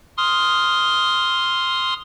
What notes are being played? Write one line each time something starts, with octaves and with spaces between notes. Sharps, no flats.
C6 D#6 F6